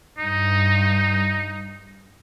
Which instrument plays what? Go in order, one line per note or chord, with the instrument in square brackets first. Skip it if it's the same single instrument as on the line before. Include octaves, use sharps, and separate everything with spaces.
[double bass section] G2 [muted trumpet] D#4